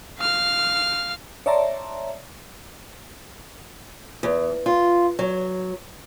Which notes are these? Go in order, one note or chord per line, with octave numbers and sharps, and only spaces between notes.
F5 F6
C#5 D5 E5 A5 A#5 C6
E2
F4
F#3